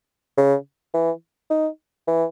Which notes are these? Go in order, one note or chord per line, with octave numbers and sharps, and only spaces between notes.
C#3
E3
D#4
E3